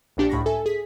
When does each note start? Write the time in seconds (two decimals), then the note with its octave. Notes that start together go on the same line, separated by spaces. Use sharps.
0.17 A#1 A#2 D4 G4 C#7
0.30 C#2 A2 B5 C#6 A#6
0.46 A4 E5 G#5
0.66 G#4 B6